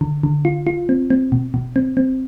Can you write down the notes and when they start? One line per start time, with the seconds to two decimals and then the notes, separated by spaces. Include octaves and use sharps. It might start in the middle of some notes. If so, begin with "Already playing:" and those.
0.01 D3
0.23 D3
0.45 F4
0.67 F4
0.89 C4
1.10 C4
1.32 B2
1.54 B2
1.76 C4
1.97 C4